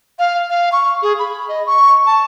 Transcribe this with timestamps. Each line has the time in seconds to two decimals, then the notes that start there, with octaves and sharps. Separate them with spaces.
0.19 F5
0.50 F5
0.72 C#6
1.02 G#4
1.19 B5
1.48 D#5
1.66 C#6
2.06 A5